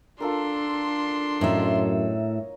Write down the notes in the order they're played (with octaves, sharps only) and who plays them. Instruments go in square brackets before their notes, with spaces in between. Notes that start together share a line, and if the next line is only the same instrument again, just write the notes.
[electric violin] D4 C6 [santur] F4 A4 A#4
[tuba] F#2 [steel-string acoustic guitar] A2 E5 [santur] C#5 D#5 A#5